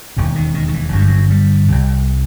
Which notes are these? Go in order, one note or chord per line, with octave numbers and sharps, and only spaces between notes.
E1 D#2 E3
D#3
D#3
D#3
E3
G1 G2 F#3 G3
F#3
G3
C2 C3